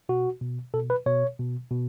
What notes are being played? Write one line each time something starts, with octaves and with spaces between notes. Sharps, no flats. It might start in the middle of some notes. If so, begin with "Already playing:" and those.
B2 F#4
B2
B2 A4
B4
B2 C#5
B2
B2